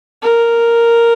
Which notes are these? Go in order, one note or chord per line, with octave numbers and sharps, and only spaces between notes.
A#4